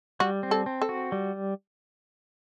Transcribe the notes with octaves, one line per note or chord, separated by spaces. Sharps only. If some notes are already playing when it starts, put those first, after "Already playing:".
G3 F#4
C4
A4
C4
A4
F#4
G3